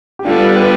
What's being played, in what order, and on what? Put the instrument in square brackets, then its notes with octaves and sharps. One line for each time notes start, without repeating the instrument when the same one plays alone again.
[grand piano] G4
[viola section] D3 G3 B3 [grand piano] D4 F4
[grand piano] G4 B4